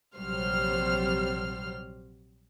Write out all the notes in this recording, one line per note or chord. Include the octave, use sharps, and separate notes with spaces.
A#1 C3 F#3 G3 C5 F6